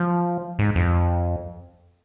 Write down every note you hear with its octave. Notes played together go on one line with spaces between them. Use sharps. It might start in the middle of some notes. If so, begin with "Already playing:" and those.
Already playing: F3
G#2
F2